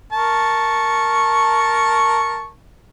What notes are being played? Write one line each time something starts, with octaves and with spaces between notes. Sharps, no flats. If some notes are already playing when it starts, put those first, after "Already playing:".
A#4 A5 C#6